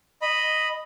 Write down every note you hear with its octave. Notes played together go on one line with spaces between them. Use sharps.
D#5 B5